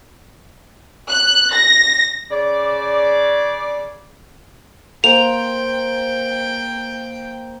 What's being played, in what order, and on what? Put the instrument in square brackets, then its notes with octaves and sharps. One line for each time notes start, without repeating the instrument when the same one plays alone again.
[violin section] F#6
A#6
[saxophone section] C#3 D5
[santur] A#3 C5 [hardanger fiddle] G5 [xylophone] F7